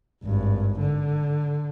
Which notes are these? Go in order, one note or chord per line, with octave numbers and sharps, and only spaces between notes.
G#1 G2
D3